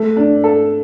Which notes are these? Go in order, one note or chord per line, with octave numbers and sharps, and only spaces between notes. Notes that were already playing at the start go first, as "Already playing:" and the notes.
Already playing: A3
D4
A4